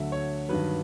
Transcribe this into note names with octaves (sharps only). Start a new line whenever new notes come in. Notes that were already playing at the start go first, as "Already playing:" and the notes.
Already playing: D2 D3 F#3 E5
C#5
G2 D#3 F#3 B4